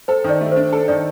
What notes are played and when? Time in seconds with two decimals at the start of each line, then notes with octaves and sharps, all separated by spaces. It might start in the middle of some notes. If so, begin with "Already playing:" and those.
0.08 A4 C5
0.24 D#3
0.29 D5
0.41 A3
0.52 C5
0.56 D4
0.73 A4
0.88 D#3 D5